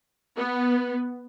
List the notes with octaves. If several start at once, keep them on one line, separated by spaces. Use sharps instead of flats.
B3